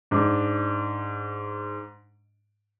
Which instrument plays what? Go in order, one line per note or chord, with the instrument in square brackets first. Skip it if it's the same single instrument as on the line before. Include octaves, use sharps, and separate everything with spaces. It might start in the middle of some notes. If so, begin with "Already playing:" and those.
[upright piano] G#2 D4